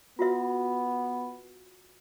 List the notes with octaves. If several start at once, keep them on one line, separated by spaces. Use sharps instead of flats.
B3 F4 F#4 E5